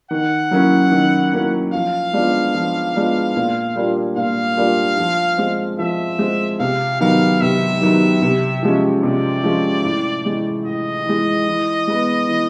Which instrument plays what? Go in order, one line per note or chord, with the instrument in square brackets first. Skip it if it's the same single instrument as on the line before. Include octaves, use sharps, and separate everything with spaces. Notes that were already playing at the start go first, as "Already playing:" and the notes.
[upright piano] D#3 [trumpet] F#5
[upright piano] F#3 A#3 C#4 E4
D#3
F#3 A#3 C#4 E4
[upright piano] F3 [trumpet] F5
[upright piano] G#3 B3 D4 F4
F3
G#3 B3 D4 F4
A#2
G3 A#3 D4 F4
[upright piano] A#2 [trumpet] F5
[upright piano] G3 A#3 D4 F4
F3
G#3 C4
[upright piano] F3 [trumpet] E5
[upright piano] G#3 C4
[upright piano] C3 [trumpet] F5
[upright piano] D#3 F#3 B3 [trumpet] F5
[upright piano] C3 [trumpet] E5
[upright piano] D#3 F#3 B3
C3
F3 G#3 C#4
[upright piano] C3 [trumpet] D5
[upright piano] F3 G#3 C#4
A2
E3 G#3
[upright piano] A2 [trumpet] D#5
[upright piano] E3 G#3
E3
G#3 B3
E3